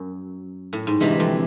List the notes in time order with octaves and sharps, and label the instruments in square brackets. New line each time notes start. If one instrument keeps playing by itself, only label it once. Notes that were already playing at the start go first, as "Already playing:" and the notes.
Already playing: [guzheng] F#2
A2
G#2
[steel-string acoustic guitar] D2 C3 E3 G#3 [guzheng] G2
[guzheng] F2